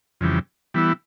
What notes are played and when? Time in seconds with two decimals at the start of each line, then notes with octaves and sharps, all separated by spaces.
0.21 F2 C#3 E3 G3
0.74 E3 G3 B3 E4